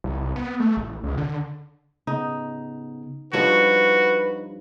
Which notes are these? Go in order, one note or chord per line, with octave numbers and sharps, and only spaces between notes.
C2
B3
A3
A1
C#2
D3
C#3 B3 D#4
G2 F3 D#4 F#4 B4 C#5